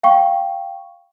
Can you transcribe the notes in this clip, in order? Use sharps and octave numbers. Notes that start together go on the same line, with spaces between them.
F5 G5 C#6